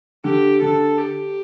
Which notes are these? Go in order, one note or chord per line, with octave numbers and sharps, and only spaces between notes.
D3 G4
D3 A4
G4